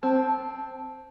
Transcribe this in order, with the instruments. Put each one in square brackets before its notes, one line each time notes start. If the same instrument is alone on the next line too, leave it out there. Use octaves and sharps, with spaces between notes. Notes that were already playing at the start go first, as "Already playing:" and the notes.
[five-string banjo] C4 [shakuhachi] A5